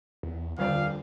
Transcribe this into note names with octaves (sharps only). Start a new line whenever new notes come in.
E2
D#1 F2 D3 D5 F5